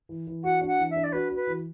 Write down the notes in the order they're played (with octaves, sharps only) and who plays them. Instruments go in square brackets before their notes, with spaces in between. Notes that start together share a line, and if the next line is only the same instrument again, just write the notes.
[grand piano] E3
E3
[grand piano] F#4 [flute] F#5
[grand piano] D4
[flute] F#5
[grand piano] E3
[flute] E5
[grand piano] D4
[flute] D5
[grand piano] F#4 [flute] B4
[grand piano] F#4
[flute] B4
[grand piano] E3